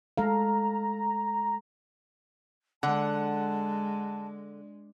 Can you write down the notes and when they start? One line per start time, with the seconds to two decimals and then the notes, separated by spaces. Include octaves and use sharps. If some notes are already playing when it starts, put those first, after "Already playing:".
0.18 G#3 A4 F5 A#5
2.83 D3 G#3 F#5 A5